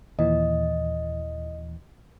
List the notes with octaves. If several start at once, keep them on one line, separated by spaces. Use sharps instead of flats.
D#2 A#2 E3 D#5